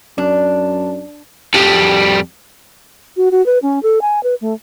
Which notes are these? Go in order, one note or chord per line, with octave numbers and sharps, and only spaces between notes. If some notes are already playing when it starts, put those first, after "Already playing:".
F#2 D4
F2 G3
F#4
F#4
B4
C#4
A4
G#5
B4
A3